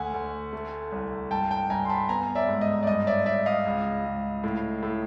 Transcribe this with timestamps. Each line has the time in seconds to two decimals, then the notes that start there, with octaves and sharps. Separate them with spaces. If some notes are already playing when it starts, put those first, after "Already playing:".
Already playing: D2 F#5 G#5
0.14 D2
0.53 A3
0.92 C2
1.31 G2 G5 A5
1.51 G5 A5
1.70 G2 G#5 A#5
1.85 C6
1.89 A5 B5
2.09 B3 G#5 A#5
2.35 D5 E5
2.48 G#2
2.61 D#5
2.83 D5
2.87 G2 D#5
3.07 D5 E5
3.26 G2 D5 E5
3.46 D#5 F5
3.66 C#2
4.05 C#2
4.44 A2
4.83 A2